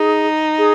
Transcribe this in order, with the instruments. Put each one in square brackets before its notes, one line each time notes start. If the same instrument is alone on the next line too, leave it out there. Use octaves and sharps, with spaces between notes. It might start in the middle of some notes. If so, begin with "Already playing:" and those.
Already playing: [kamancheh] D#4 [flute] G#4
[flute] G#4